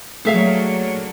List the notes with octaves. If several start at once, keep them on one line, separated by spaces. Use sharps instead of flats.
F#3 A3 A#3 D4 G#4 E5 F5